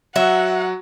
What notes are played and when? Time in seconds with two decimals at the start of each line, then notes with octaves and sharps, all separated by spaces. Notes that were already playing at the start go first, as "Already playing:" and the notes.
0.16 F#3 F#4 E5 F#5